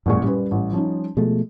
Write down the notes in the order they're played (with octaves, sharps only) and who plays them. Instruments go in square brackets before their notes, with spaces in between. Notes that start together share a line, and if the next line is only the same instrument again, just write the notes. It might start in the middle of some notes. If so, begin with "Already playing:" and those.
[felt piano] A1 A#2 C#6 [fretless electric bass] F#2 G#3
[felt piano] F#2 B4 [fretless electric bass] G3
[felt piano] A1
F3 C#4 D#4
[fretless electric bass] B2 F3 A3 [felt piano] G#3